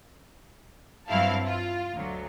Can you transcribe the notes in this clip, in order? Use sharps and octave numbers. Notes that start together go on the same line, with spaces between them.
G2 F#3 C4 E4 F5 A5
F4
D2 F#3